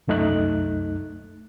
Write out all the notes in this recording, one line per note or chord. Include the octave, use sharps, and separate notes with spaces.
C2 F#2 A3 D#4 F#6